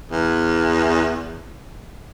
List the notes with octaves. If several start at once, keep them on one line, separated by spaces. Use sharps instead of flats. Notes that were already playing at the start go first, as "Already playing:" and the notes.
E2